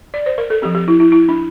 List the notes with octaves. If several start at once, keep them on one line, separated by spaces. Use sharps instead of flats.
D5
C5
A#4
A4
F3 C4 G4
G4
E4
E4
E4
D4